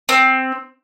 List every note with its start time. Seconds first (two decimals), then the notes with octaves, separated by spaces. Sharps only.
0.09 C4